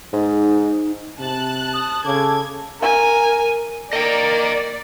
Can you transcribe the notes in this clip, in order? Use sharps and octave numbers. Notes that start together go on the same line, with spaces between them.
G#2 D#4
C3 A5 F#6
D#6
C#3 A4 D6 G#6
A#4 G#5
A#3 D5 D#5 G5